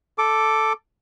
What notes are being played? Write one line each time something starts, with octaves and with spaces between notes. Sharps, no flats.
A4 D6